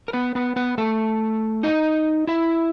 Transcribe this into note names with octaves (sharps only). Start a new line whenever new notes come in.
A#4
B3 B4
B3 B4
B3 B4
A3 A4
D#4 D#5
E4 E5